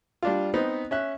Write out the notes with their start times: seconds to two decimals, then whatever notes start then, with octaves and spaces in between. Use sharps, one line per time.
0.23 G3 D4 F4
0.54 B3 C4 D#4
0.91 C#4 E5 F#6